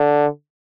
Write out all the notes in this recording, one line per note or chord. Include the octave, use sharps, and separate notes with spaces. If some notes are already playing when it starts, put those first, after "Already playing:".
Already playing: D3